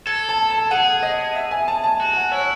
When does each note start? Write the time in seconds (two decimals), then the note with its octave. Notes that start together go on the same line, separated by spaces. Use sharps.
0.07 A4 G#6
0.29 A5
0.50 A5
0.71 G#4 F#5
1.03 D#5
1.35 E5
1.51 G#5
1.68 A5
1.84 A5
2.00 F#4
2.16 F#5
2.31 E4 C#5